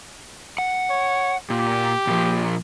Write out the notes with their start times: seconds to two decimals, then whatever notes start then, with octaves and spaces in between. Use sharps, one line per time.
0.58 F#5
0.90 C#5
1.50 A#2 G4
2.07 A#2 F3